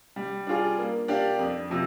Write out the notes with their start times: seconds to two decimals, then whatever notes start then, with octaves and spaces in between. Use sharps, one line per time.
0.16 G3
0.47 D4 F4 G#4 D5
0.79 A#3
1.08 D4 G4 D5 F5
1.39 F2
1.70 C3 F3